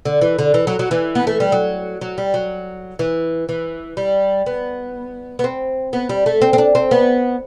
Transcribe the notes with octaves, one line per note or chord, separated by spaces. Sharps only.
D3
E3
D3
E3
F#3
F#3
E3
B3
A3
G3
F#3
F#3
G3
F#3
E3
E3
G3
B3
B3
C4
B3
G3
A3
C4
C4
D4
C4
B3